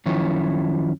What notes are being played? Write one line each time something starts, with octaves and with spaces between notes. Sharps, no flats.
F#2 D#3 F3 C#4 E4 C#5